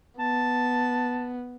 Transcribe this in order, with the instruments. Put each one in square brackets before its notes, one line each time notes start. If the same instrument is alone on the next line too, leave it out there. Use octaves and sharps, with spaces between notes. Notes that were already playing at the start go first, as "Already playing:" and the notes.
[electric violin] B3 [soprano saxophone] A5